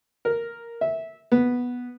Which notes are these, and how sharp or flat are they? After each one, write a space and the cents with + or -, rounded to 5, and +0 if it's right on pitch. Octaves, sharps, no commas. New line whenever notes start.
A#4 +0
E5 -15
B3 -5